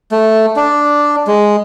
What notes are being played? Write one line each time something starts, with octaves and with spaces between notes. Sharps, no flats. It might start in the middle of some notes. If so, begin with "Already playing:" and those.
A3
D4
G#3